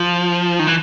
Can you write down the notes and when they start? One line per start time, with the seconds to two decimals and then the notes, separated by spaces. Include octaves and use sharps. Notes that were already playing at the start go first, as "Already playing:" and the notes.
Already playing: F3
0.59 D#3
0.67 E3